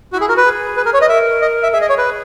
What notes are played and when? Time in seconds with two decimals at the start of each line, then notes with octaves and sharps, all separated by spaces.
0.13 E4 F#4
0.21 G#4
0.29 F#4 A#4
0.37 B4
0.45 G#4
0.77 B4
0.85 A#4
0.94 C#5
0.98 B4 D#5
1.09 A#4 E5
1.42 D#5
1.63 E5
1.73 G#4 E5
1.81 D#5
1.89 C#5
1.98 B4